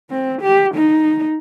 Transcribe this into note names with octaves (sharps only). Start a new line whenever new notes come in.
C4
G4
D#4